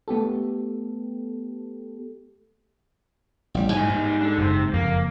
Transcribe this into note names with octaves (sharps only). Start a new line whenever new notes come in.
A3 B3 G4 A4
A1 G3
G#2 G3 G#5
G#2
D4 A4
F#1 C3
F#1 F2 A#3